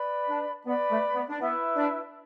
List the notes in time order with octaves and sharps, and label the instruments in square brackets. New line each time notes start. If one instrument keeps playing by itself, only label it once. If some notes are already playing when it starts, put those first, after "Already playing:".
Already playing: [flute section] B4 D5 B5
[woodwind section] D4
[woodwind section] B3 [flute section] B4 D5 B5
[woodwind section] A3
B3
D4
[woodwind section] B3 [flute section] E4 B4 E5
[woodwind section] D4